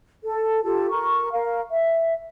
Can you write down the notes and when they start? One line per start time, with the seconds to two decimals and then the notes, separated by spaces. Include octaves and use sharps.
0.23 A4
0.63 F4 G4 A4 A5
0.89 A#4 C#6
1.32 A#4 F5
1.70 E5